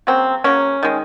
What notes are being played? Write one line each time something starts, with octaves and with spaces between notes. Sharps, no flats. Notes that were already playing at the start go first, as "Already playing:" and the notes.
C#3 F#3 A#3 C4
C#3 F#3 A#3 C#4
D#3 G#3